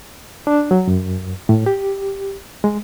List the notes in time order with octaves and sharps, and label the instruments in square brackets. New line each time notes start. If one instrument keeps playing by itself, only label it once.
[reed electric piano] D4
F#3
F#2
A2
G4
G#3